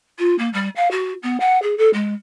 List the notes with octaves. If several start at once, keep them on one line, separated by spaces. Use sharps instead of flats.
F4
A#3
G3
F5
F#4
B3
F#5
G#4
A4
G#3